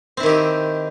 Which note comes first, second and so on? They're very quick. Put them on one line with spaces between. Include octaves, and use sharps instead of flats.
C4 E4 D#3 G4 D#4